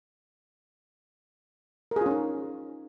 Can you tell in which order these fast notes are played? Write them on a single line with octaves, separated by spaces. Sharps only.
A#4 G#4 F4 C#4 D#4